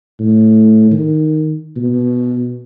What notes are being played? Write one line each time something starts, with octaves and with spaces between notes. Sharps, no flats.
A2
D#3
B2